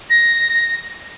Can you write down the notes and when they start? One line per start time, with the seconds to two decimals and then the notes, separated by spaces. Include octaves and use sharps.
0.09 A#6